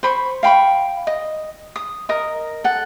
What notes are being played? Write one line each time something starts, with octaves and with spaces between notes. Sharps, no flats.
C5 B5 C#6
F5 G5 B5 C#6
D#5
D#6
A#4 D#5 D#6
A4 F#5